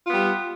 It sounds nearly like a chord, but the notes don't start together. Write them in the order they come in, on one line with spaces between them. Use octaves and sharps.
F4 B3 G3